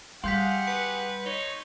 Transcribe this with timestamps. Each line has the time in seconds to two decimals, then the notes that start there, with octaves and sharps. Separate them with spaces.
0.24 G3 G4 G#4 F5 F#5 C6 G6 B6
0.67 B4 C#7
1.26 D#4 C#5